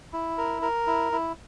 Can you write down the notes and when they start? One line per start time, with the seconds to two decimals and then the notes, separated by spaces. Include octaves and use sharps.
0.13 E4
0.38 A#4
0.62 A#4
0.87 E4
1.12 E4